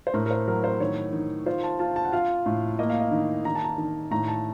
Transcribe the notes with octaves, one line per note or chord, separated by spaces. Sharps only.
C5
A2 A#4
A#4
C5
F#3 A#4
C5
D#3 C#5
D#3
F4 C5
A5
F4 A5
A5
F#5
F4 F5
A2
A#3 D#5
F5
D#5
D#3
D#3 A#5
A5
A#5
D#3
A2 A#5
A5